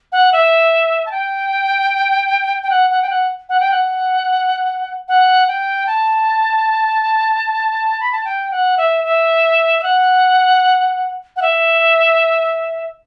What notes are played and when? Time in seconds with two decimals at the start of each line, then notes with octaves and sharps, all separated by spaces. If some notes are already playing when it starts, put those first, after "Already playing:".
0.12 F#5
0.32 E5
1.06 A5
1.11 G5
2.63 G5
2.70 F#5
2.90 F#5
3.02 G5
3.10 F#5
3.49 F#5
3.60 G5
3.71 F#5
5.08 F#5
5.48 G5
5.87 A5
8.00 B5
8.12 A5
8.25 G5
8.51 F#5
8.77 E5
9.04 E5
9.79 E5
9.83 F#5
11.36 F#5
11.42 E5